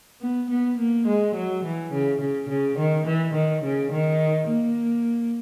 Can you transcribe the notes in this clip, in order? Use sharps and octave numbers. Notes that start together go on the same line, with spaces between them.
B3
B3
A#3
G#3
F#3
E3
C#3
C#3
C#3
D#3
E3
D#3
C#3
D#3
A#3